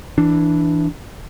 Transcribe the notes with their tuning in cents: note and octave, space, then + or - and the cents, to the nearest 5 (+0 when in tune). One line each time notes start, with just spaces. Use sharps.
E3 +0 D4 +0